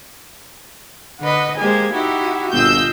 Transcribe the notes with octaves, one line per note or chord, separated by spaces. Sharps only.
D3 B4 D#5 F#5
G#3 A#3 G4 C5 G#5
D#4 E4 F#4 G4
G1 A#2 F4 D#5 E6 G6